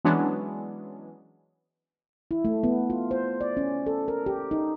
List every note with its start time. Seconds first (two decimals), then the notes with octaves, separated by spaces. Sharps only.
0.05 E3 F#3 G#3 B3 C#4 D4
2.31 E4
2.45 A3
2.64 B3
2.90 F4
3.11 C5
3.41 D5
3.57 C#4
3.86 A4
4.08 A#4
4.26 G4
4.51 D#4